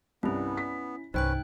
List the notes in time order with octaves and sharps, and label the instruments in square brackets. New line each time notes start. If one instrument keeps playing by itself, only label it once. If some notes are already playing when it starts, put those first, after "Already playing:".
[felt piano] C2 G2 [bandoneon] B3 [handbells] C#4 E4
[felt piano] B6
[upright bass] C2 G2 [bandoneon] C#4 B4 [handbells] D#4 G5 F#6 [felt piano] C5